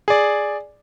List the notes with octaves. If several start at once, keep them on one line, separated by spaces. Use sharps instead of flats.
G#4 D5